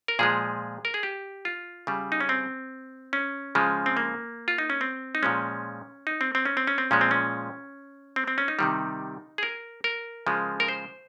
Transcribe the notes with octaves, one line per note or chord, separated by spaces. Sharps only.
A#4
A#2 F3 G#3 G#4
A#4
G#4
G4
F4
C#3 G3
D#4
C#4
C4
C#4
C#3 F3 G#3
C4
A#3
F4
D#4
C#4
C4
D#4
A#2 F3 G#3 C#4
D#4
C4
C4
C#4
C4
C#4
C4
A#2 F3 G#3 C#4
C4
C#4
C4
C4
C#4
D#4
C3 D#3 G3
G#4
A#4
A#4
C#3 F3 G#3
A#4
C5